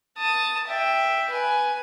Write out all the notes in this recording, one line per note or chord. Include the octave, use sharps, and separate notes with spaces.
A5 D#6
E5 G5
B4 G#5